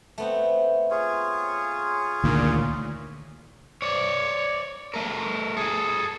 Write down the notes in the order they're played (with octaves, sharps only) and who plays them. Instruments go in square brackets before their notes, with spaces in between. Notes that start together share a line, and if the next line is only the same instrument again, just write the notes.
[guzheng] A3 B3 C4
[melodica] F4 G#4 C#5
[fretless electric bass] D2 D#3 [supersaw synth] A#2
[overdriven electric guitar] C#5 D5
A3 A#4
G#4 A4